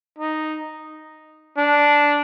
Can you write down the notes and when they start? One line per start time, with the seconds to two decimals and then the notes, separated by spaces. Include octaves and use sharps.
0.18 D#4
1.58 D4